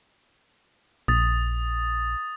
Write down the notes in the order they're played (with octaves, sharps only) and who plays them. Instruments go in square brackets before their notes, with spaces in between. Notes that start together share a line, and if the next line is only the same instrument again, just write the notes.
[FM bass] A#1 [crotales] D#6 A6